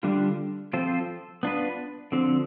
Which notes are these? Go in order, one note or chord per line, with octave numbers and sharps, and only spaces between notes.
D3 G3 D4 F4
F3 C4 F4 A4 C5
B3 D4 F4 B4
D3 F3 C4